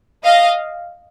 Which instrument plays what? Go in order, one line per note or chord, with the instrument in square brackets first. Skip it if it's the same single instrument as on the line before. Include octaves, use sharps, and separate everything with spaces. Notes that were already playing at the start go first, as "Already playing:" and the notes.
[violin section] D#5 F5